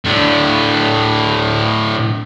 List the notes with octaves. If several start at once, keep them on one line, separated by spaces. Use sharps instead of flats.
A2 D4